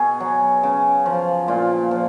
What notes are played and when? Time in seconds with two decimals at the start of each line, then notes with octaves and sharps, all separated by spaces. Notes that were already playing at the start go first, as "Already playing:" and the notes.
Already playing: B2 G#4
0.20 F#3
0.63 C#3
1.06 F3
1.48 A#2 F4
1.91 F3